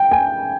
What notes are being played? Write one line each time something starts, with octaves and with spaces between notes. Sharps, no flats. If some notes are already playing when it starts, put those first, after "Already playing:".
Already playing: G5
G#5